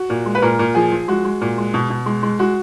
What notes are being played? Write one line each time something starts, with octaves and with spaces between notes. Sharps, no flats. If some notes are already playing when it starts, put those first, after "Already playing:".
Already playing: F#4
A#2
G#3
B4
A#2 A#4
A#2
F3 G#4
F3
G#3 F#4
G#3
A#2
G#3
B2
B2
G#3
G#3
G#3 F#4